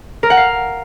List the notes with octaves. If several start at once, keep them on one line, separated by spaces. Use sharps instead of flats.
A#4
F#5
F5